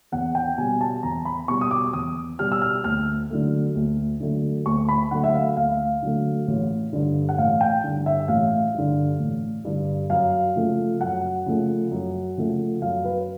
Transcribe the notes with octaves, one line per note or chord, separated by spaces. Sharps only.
E2 F#5
G5
B2 G3 G#5
A5
E2 A#5
B5
B2 G3 C#6
D#6
D6
E2 D#6
B2 G3 F6
E6
F6
D2 F6
D3 F#3 A3
D2
D3 F#3 A3
D2 C#6
B5
D3 F#3 A3 F#5
E5
F5
D2 F5
D3 F#3 A3
A1
G2 D3
F#5
A1 F5
G5
G2 D3
E5
A1 F5
G2 D3
A1
G2 D3
F#2 F5
C#3 F3 A3
F#2 F#5
C#3 F3 A3
F#2
C#3 F3 A3
F#2 F5
B4